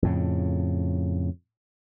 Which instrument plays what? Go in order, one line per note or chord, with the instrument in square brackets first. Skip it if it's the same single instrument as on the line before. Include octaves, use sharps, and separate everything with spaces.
[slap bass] F2 A2 C#3